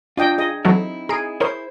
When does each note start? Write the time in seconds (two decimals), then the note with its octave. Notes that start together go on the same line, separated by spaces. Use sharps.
0.17 D4 F4 D#5 G5
0.38 G#4 D#5
0.65 E3 F#3 C4 D#4 E4 A4
1.09 G#4 A#5 C7 D7
1.40 E4 A#4 C5 C#5 D#6